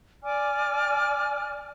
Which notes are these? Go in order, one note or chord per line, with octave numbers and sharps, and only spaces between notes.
D5 G#5 D6 F6